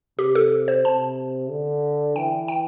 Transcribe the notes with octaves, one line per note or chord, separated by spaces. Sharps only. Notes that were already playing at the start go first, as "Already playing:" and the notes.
C3 G4
A4
C5
C3 A5
D3
E3 G5
G5